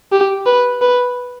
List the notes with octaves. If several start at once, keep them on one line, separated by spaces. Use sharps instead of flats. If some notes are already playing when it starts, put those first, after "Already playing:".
G4
B4
B4